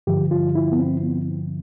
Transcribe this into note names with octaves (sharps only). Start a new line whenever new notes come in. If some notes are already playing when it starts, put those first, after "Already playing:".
G2 D3 F3 G4
F4
E4
B3
C4
B3